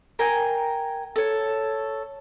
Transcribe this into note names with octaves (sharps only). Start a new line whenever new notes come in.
A#4 G5 G#5
A4 C#5